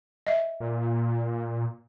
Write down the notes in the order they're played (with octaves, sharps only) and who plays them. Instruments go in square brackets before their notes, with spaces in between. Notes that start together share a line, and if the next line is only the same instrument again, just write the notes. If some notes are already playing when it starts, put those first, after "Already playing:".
[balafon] D#5 E5
[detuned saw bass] A#2